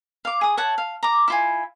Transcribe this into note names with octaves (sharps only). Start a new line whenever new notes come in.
F5 D6
G#4 D#6
C#5 E5 F#5 A5
F5
A#5 D6
E4 F4 G#5